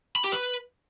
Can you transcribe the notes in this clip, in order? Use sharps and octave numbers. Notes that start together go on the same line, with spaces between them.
B5
G4
B4